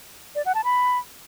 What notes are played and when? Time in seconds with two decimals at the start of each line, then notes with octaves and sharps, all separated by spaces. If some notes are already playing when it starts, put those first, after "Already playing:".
0.35 D5
0.46 F#5
0.55 A5
0.64 B5